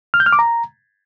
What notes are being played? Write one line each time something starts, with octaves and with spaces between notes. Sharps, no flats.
F6
G6
F6
D6
A#5